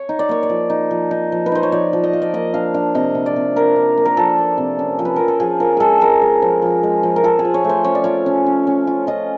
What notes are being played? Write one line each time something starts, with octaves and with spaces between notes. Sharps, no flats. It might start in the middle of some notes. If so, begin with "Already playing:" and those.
Already playing: C#5
D#4
D5
A#3 C#5
D5
F3
D#4
F3
D#4
F3
B4
D#4 C5
C#5
F3 D5
F3
D#5
F3
D5
A#3 D#5
D4 F5
D4 F5
C3 D#5
C3
D5
C3
D4 A#4
D4
A#3
A#4
F3 A4
A#3
C3
C#4
F3
B4
F3 A#4
A4
F3 G#4
F3 A#4
G#3 G#4 A4
G#3 A#4
G#3
F3
F3
G#3
F3
A#4
F4 A4
G#4
F3
C#5
A3 C5
C#4 C#5
D5
F4 C#5
C#4
C#4
C#4
F4
F4 D#5